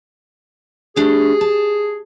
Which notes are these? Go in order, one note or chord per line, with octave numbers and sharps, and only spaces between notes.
A3 D4 G4 G#4
A5